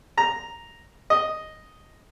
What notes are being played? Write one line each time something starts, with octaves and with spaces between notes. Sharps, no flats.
A#5
D#5